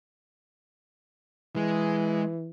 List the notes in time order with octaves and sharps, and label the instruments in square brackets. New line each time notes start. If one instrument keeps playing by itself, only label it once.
[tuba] E3 [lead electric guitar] G#3